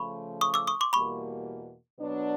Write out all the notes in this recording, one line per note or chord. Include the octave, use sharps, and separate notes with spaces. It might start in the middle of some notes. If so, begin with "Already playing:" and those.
Already playing: C#3 F3 A3 B5 C#6
C#6 D#6
D6 E6
C#6 D#6
C6 D6
E2 B2 G3 A#3 B5 C#6
B2 F#3 B3 D4